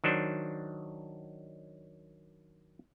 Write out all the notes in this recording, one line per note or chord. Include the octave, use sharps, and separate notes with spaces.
D#3 F#3 D4 C5